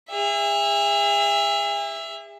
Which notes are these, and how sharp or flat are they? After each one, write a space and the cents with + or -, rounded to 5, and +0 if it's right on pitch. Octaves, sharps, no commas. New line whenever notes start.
G#4 -40 E5 +10